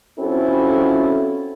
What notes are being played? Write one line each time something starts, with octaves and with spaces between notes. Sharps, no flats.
F3 C4 C#4 E4 F#4 A4